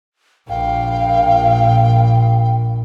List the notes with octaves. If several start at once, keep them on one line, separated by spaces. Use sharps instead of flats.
A#1 A#2 F5 G5